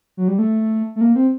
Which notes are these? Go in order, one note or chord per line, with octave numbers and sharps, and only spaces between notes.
F#3
G3
A3
A3
A#3
C4